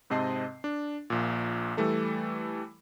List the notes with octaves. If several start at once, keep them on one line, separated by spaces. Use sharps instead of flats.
G#2 C3 C4 D#5 A5 C7
D4
A#1 A#2
E3 G3 A3 A4